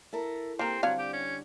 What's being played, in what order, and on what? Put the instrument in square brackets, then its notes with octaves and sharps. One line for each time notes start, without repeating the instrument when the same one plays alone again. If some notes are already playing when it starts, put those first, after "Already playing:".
[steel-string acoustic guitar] E4 A4 A#4
[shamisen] A#3 A#4 [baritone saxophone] C4 [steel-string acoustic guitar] G4
[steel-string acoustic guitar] D3 G3 [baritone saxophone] F#3 [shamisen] C4 D4 F5
[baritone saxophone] G4
C#4